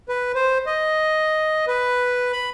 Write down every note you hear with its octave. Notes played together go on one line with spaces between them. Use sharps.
B4
C5
D#5
B4
B5